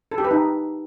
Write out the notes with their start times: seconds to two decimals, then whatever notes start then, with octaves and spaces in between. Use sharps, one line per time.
0.11 A4
0.18 G4
0.24 B4
0.31 D#4